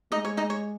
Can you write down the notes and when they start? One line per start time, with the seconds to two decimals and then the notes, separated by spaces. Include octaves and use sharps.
0.12 G#3 D#4 D#5
0.25 C#5
0.37 D#4 D#5
0.50 C#5